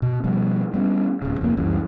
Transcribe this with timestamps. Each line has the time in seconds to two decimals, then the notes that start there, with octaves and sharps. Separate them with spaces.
0.02 B2
0.24 B2 F3 G3 B3
0.74 G3 B3 C#4
1.22 D1 C#3
1.41 F1 F2 A#2 A#3
1.57 C#2 F#2 E3 G3